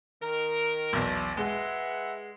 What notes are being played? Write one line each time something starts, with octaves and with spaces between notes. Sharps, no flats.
D#3 A#4
B1 E2
G#3 B4 E5 F#5